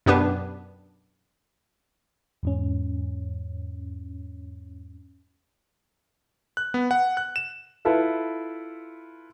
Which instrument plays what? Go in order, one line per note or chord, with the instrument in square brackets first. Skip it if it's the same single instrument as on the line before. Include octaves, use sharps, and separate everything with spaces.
[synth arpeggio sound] F#2 B2 B3 D4 G4 B4
[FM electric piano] E2 G#2 C#4
[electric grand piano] F#6
B3
F#5
F#6
E7
[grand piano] E4 F4 A4 B4 E5